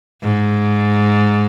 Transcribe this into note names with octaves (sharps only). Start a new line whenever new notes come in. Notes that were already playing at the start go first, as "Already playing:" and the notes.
G#2